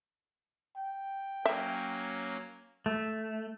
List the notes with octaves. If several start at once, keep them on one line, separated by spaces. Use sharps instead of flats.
G5
F#3 A#3 C#4 E5
A3